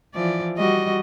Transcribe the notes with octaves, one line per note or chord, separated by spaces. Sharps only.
E3 F3 D5
G3 F#4 D#5